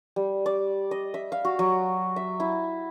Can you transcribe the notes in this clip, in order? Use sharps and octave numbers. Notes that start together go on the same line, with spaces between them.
G3
D5
D#5
E5
F5
F#4
F#3
E5
E4